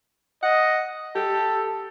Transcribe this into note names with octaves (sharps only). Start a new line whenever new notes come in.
D#5 F#5
G4 A4